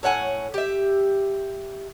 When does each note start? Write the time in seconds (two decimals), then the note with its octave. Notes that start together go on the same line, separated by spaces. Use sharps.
0.03 A2 C#5 F#5 G#5
0.54 G4 E5